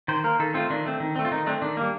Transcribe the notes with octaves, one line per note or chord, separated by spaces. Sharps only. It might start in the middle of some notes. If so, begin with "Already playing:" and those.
D#3 C5
A#3 A#4
D#3 A4
A3 C4 F4
D#3 D4
A3 C4
D#3
A3 C4
F4
D#3 D#4
A3 C4 D4
D#3 D4
G3 A#3